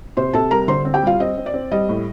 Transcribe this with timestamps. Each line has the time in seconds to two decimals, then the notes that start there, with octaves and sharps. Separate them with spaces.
0.17 C3 C5 C6
0.33 C3 A4 A5
0.51 G3 A#4 A#5
0.68 D3 C5 C6
0.85 C4
0.94 G4 G5
1.02 G3 F4 F5
1.20 C4 D#5
1.37 C4
1.46 D5
1.54 C4
1.72 G3 D#5
1.89 A2